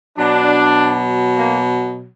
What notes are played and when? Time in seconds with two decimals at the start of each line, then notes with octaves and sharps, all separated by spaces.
0.16 B2 F#3 D4
1.36 A#3